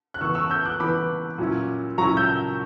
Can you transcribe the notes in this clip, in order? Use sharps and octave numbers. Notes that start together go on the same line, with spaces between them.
F#6
E3 B3 E4 C#6 E6
C#6 E6
E6 G6
D6 F#6
E3 B3 E4 B5 D6
A#2 F#3 C#4 E4
A#2 F#3 C#4 E4 A#5 C#6
E6 G6